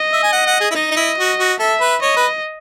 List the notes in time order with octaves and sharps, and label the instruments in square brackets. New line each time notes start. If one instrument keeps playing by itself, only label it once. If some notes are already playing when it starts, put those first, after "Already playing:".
Already playing: [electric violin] D#5
[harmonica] E5
G#5
F#5
F#5
G#4
E4
[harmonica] D#4 [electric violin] D#5
[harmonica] D#4
E4
F#4
F#4
[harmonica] A4 [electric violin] E5
[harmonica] B4
[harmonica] C#5 [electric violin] D#5
[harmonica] B4